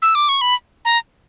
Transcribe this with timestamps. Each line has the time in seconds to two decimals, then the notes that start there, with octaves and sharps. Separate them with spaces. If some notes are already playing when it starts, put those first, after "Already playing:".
0.02 E6
0.15 D6
0.29 C#6
0.41 B5
0.85 A#5